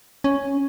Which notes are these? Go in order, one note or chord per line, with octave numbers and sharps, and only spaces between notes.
C#4